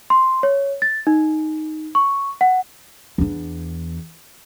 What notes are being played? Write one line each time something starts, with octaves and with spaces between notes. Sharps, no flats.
C6
C#5
A6
D#4
C#6
F#5
E2 D4